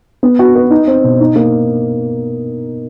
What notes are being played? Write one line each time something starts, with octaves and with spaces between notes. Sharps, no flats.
B3
F#4
B4
D#4
C4
B2
D#4
A#3